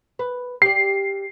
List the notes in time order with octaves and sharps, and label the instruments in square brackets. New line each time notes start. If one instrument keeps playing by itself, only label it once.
[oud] B4
[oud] G4 D5 [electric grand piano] C7